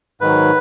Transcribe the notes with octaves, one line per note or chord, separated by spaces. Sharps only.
G#2 D#3 F#3 B4